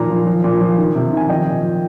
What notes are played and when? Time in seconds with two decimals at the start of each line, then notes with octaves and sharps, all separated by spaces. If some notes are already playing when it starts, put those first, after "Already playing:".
Already playing: A#2 D#3 F3 A#5
0.10 F3
0.27 F3
0.44 A#2
0.61 F3
0.78 D#3
0.95 C3
1.12 D#3 G#5
1.29 F3 D#5 G5
1.47 A#2
1.62 F3